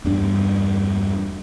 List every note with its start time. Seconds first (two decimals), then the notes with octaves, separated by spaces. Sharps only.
0.04 E2 G2 G3 D4